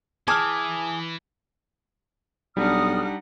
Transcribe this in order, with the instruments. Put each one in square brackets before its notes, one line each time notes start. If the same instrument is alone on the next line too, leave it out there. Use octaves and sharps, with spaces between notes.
[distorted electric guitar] E3 [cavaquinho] G#4 G#5 D6 [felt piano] A5 F6
[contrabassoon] B1 [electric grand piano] G3 D4 [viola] D#4 F#5 [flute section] D#6 F6